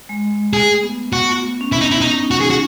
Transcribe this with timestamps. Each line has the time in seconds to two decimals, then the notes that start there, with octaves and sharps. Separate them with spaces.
0.09 G#3
0.53 A3 G#4
0.83 B3
1.13 B3 F#4
1.27 A3
1.61 C#4
1.71 B3 E4
1.81 D#4
1.91 E4
2.01 C#4 D#4
2.23 D#4
2.31 C#4 F#4
2.40 G#4
2.50 F#4